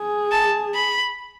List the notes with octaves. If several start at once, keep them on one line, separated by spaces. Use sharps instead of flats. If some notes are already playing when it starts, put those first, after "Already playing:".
Already playing: G#4
A5
B5